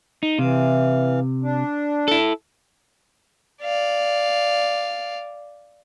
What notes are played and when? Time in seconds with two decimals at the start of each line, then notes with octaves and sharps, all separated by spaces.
0.23 D#4
0.39 C3 E3 F5
1.42 D4
2.08 E4 A4
3.63 D5 F5